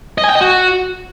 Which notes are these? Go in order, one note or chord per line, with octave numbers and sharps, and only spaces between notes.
D#5
G#5
G5
D#5
F#4